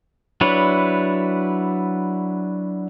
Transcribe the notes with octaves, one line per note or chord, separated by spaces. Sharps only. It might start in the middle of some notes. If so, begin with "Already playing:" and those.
F#3 D4 E4 B4 C#5